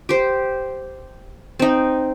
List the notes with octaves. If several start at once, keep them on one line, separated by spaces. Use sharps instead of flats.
G4 C5
C4 D#4